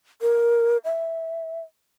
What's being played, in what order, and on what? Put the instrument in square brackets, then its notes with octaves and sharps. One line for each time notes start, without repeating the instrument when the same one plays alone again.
[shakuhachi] A#4
E5